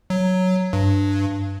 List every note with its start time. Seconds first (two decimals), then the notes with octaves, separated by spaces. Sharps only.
0.10 F#3
0.73 G2